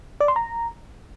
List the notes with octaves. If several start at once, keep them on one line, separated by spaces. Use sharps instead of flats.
D5
C6
A#5